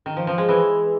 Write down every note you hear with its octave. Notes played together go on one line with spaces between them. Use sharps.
D#3
F3
F3
G#3
E3